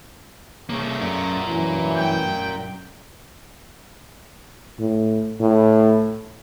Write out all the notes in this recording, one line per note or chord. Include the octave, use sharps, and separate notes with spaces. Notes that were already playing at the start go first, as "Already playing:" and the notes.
C2 C#3 F3 A3 A#3
F#2 A#4 D5
E3 F#3
G5
A2
A2